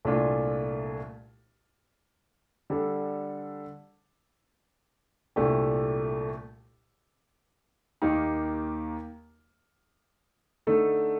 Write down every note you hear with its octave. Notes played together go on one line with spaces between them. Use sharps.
C2 A#2 A3 D4 F4
D3 G3 D4 A4
C2 A#2 A3 D4 G4
D#2 D#3 A#3 D#4 G4
D3 A3 D#4 A4